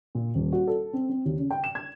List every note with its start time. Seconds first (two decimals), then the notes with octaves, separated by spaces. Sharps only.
0.15 A#2
0.35 D#1
0.53 F#4
0.67 A4
0.93 C4
1.09 C4
1.25 D#2
1.38 C#3
1.50 G5
1.64 E7
1.75 G#6